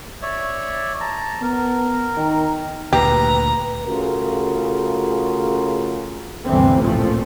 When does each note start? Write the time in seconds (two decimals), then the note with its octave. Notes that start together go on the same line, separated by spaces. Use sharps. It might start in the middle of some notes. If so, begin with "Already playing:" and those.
0.22 C#5 D5 E5
1.00 A5 A#5
1.43 B3 A#4
2.17 D#3
2.93 D2 A#2 G4 B4 A#5
3.86 C#3 A3 F4 F#4 G#4 A#4
6.44 G1 D2 C3 E3 C4
6.78 A1 A#2 F3 A3